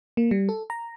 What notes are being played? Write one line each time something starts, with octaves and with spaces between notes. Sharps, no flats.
A#3
G3
A4
A#5